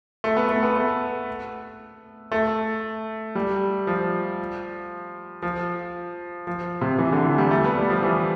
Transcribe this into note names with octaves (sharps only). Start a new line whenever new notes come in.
A3
B3
A3
B3
A3
A3
G3
F3
F3
F3
C3
E3
D3
E3
G3
A3
B3
G3
F3
E3